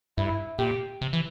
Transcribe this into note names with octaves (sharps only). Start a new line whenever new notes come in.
G2 E4
A#2 G4
C3
E3